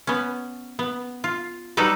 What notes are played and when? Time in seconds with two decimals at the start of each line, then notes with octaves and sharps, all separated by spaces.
0.07 B3 C#4
0.79 B3
1.24 F4
1.77 F#3 G3 D#4 F#4 A4 B4